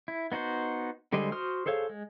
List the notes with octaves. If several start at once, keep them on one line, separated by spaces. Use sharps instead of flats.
E4
B3 D#4 F#4 C5
D3 G3 G#3 C5 D#5
F#4 C5 C6 D#6 F6
G#4 A4 C5 C#5 F5
G#3